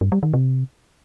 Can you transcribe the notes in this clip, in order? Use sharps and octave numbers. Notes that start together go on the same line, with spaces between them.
G2
G3
D#3
C3